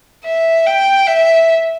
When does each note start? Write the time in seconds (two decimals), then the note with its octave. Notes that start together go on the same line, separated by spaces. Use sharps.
0.24 E5
0.66 G5
1.07 E5